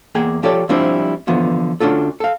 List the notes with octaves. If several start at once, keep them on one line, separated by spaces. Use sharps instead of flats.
E2 A#3 G#4 G5
F3 G4 A4 C#5 D5
F3 G3 C4 D4 E4
D3 E3 F3 B3
D2 C#4 D4 F4 A4
A4 F5